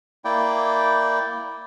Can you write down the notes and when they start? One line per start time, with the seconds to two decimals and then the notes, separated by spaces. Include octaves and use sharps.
0.25 A#3 E4 D5 G5